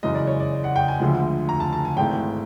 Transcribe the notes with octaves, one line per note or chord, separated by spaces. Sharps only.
F#2 C#3 E3 G#3 D#5
D5
C#5
D5
F#5
G5
G#5
D2 D3 F3 G#3
A#5
A5
A5
G#5
G#1 G#2 E3 A3 G5